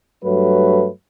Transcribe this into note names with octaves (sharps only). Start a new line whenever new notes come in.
G2 F#3 A3 B4